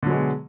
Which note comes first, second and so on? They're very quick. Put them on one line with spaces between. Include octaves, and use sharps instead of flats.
D3 F#3 G#3 B2